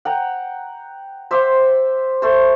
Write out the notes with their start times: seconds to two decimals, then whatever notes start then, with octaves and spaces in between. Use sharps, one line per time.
0.05 F#5 G5 A#5
1.31 C5 E5 C6 D6
2.22 A3 C5